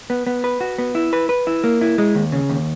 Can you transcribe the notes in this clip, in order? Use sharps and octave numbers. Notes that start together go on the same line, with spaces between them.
B3
B3
B4
F#4
B3
E4
B4
B4
E4
A#3
E4
G#3
D#2
C#3
D#2